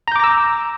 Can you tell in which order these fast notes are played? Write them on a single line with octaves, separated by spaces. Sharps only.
A#5 G6 D6 A#6 E6